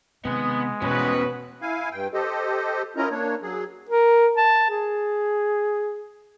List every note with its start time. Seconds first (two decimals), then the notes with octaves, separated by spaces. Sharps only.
0.25 C3 D#3 G#3 B3
0.82 E2 B2 B3 C#4 F#4 B4
1.62 E4 F5 G#5
1.92 G2 G5
2.13 G4 A4 C5 D#5
2.97 C#4 E4 F4 A#4 D#5 A#5
3.11 A#3 D4 C#5
3.42 F#3 G#4
3.89 A#4
4.37 A5
4.71 G#4